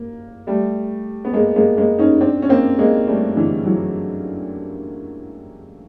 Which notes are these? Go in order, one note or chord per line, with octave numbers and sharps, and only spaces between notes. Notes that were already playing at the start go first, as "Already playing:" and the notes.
Already playing: A#3
G3 A3
B3
G#3 A#3
G#3 A#3
G#3 A#3
C#4 D#4
C4 D4
C#4
A#3 C4
G#3 A#3
G3 A3
D3 E3
E3 F#3